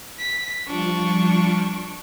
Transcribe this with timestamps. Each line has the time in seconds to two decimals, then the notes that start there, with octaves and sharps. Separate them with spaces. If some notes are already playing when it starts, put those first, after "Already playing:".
0.19 B6
0.67 F3 G3 D4 F4 C#6